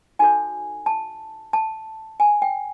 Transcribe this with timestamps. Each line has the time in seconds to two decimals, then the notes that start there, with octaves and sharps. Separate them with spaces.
0.19 D#4 F#4 A4 C#5 G#5
0.86 A5
1.53 A5
2.20 G#5
2.42 G5